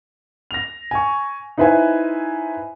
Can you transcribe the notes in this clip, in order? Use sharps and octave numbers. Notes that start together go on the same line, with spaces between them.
A#6 F7
G#5 C#6
D#4 E4 B4 C5 E5 G#5